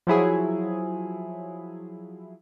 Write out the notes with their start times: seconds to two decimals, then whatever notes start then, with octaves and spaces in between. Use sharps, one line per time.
0.07 F3 F#3 E4 G#4